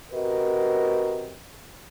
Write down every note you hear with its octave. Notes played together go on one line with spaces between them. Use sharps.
C3 F#4 A#4 B4 D#5